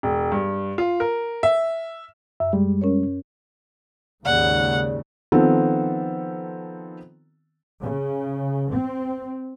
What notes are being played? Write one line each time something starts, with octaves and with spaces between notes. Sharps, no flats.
E1
G2
F4
A#4
E5
F#2 E5
G3 G#3
C#4 A#4 C#5
D#2 G#2 C#3 G#4 D5 F#5
D#3 F3 B3 C4 A4
C#3
C4